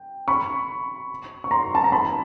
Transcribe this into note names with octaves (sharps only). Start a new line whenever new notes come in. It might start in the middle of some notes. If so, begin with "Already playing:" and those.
Already playing: G5
B5 C#6
C#6
A#5 C6
A5
A#5
A5 B5